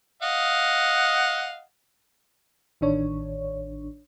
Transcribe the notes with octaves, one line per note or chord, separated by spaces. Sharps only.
D#5 F5 F#5
A1 D#3 D4 C#5